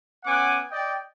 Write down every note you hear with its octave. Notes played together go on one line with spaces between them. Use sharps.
B3 C#4 F#5 G#5 D6
D5 D#5 G5